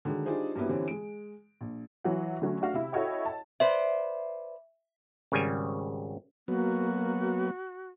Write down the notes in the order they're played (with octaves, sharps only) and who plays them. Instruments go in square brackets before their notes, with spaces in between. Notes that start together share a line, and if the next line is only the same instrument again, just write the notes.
[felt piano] D3 D#3 F#3 G#3
G3 D4 D#4 F4 G#4 C5
G2 F#3 G3 A#3 B3 E4
D3 E3 G3 C4 C#4
G#3 D7
A#1
[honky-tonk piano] E3 F#3 F#5
D3 F#3 A3 C#4
A3 D4 F#4 F5
C3 E4
E4 F#4 A4 C#5 D#5 G5
A5
[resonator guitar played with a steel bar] B4 C5 D5 [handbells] E5
[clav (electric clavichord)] G#1 C#3 G3 G#5
[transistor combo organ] F#3 B3 [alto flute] A#3 [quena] F#4